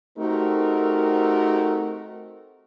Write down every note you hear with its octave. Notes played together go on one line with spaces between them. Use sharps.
A3 C4 D#4 F#4 G4 A#4